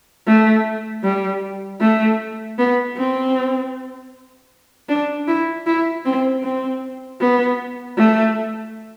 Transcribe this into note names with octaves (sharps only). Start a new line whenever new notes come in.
A3
G3
A3
B3
C4
D4
E4
E4
C4
C4
B3
A3